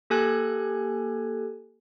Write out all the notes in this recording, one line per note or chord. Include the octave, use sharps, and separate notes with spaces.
A#3 G4 A4 G#5 F#6 G#6